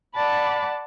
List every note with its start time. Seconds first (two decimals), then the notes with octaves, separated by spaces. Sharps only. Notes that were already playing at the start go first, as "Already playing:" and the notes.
0.14 D5 F#5 A5 B5